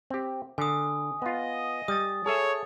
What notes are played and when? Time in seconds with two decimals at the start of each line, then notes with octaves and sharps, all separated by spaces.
0.10 C4 G4
0.58 D3 G#5 D#6
1.22 B3 F4 D#5
1.88 G3 D#6 A6
2.26 G#4 A4 C#5 E5